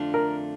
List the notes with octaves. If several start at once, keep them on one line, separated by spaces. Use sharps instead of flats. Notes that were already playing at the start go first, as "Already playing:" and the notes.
Already playing: F2 D3 A3 D4 F4
A#4